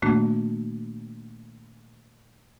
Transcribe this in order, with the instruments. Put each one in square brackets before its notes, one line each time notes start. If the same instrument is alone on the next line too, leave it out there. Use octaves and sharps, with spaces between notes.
[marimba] A#2 D#3 A3 A#3 D4 F#4